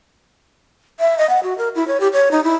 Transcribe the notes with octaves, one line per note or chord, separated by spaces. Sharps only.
E5
D#5
F#5
F#4
A#4
E4
C#5
G4
C#5
D#4
E4